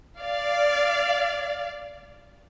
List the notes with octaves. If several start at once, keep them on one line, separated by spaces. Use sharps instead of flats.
D5 F5